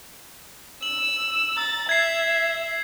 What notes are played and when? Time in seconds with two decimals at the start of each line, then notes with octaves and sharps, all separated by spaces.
0.83 E6 F#7
1.58 A#5 E6 A6
1.89 E5 G#6 C7